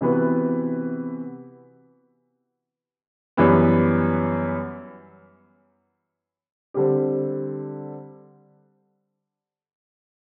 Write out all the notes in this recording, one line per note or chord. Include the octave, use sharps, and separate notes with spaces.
C3 E3 B3 F#4 B4
F#2 E3 G3 B3
D3 G3 C4 G4